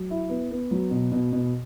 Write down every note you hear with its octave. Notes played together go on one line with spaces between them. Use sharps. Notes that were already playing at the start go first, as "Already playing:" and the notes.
Already playing: F#3
E4
B3
B3
F#3
B2
B2
B2